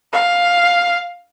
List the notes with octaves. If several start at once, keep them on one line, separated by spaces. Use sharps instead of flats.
F5